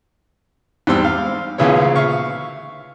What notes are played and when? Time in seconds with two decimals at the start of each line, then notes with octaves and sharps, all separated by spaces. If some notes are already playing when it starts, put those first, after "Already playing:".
0.87 E2 G#2 G3 C4 C6 E6
1.05 F5
1.58 A1 D2 A#2 C#3 B3 C#5
1.96 E5 F5 C#6